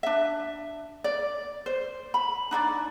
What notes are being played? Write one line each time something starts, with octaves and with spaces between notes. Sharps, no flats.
D4 E5
D5
C5
B5
D4 D#4 D5